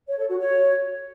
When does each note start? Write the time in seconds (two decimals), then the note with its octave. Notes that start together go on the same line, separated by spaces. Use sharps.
0.07 C#5
0.18 A4
0.28 F#4
0.39 C#5